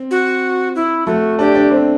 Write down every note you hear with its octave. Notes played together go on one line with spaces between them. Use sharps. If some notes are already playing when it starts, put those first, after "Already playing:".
Already playing: C4
F#4
E4
A3 F#4
D4 G4
D4
C4